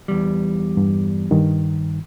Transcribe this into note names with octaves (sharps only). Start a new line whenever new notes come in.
E2 G3
G2
G2 D#3